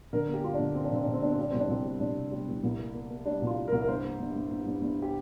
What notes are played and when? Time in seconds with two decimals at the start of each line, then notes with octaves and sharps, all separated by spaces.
0.13 D3 A#4
0.28 A#3
0.34 G4
0.43 G2 F4
0.54 D4
0.59 D3
0.75 A#3 C4
0.84 D4
0.91 D3 C4
1.03 D3 D4
1.13 C4
1.22 G2 D4
1.32 C4
1.38 G3 D4
1.50 C2 C4
1.60 D4
1.69 C2 C4
1.84 G3
2.00 C2 D4
2.17 C3
2.31 G3
2.48 C2
2.63 C2
2.79 A#3
2.95 A#3
3.11 A#3
3.25 G3 D4
3.41 C2
3.47 F4
3.56 G3
3.68 C2 A#4
3.81 A#4
3.88 G2 C5
4.04 A#3
4.20 G2
4.36 G2
4.51 G2
4.66 G2
4.82 G2
5.02 G4